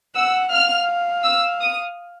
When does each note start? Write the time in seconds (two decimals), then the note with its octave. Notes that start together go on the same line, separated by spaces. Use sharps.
0.15 F#5 E6
0.52 F5 F6
1.24 E6
1.61 D#6